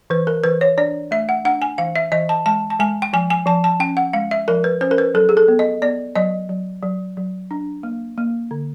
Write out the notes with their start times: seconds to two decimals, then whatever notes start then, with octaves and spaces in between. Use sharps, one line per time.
0.10 E3 B4
0.27 A#4
0.44 E3 B4
0.61 C#5
0.78 D4 D5
1.11 A3 E5
1.29 F#5
1.45 D4 F#5
1.62 G#5
1.78 E3 F5
1.96 E5
2.12 E3 D#5
2.29 A5
2.46 G#3 A5
2.70 A5
2.80 G#3 G#5
3.02 G5
3.13 F3 G#5
3.30 G#5
3.46 F3 A5
3.64 A5
3.80 C#4 G5
3.97 F#5
4.13 G#3 F5
4.31 E5
4.48 F3 A#4
4.64 B4
4.81 C#4 C5
4.91 A#4
4.98 B4
5.14 F#3 A4
5.29 G#4
5.37 A4
5.48 B3
5.59 D#5
5.82 B3 D5
6.16 F#3 D#5
6.49 F#3
6.83 F#3
7.17 F#3
7.51 D4
7.83 A#3
8.18 A#3
8.51 D3